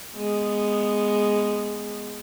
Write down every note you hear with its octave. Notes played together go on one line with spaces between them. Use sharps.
G#3 B3